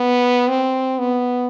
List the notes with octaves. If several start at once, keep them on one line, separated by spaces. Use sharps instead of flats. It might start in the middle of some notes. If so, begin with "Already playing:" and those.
Already playing: B3
C4
B3